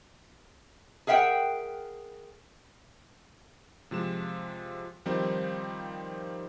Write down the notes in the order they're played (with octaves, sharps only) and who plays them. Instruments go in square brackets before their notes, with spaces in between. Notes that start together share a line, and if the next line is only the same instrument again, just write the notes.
[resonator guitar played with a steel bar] G#4 A#4 E5 F#5 G5
[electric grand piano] C3 F3 G#3 E7
D#3 F3 G3 C4 D#4